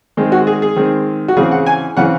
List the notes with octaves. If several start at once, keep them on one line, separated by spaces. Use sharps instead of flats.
D#3 G#3 C4
F#4
G#4
G#4
D#3 G#3 C4
F#4
C#3 E3 C4 G#4
F#5
G#5
C#3 E3 C4 F#5